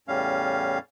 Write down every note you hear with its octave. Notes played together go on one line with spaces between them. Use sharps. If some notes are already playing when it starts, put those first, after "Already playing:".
E2 A2 G3 C#4 F5